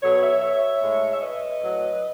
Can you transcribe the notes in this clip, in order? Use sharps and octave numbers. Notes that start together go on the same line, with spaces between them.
B2 F#3 A4 C#5
C#5 E5
C#5 E5
A2 G#3
E5
B4 D#5
A2 F#3